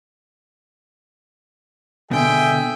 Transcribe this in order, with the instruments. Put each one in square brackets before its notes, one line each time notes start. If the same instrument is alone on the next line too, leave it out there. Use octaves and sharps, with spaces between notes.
[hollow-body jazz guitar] B2 D3 [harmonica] G#4 E5 G5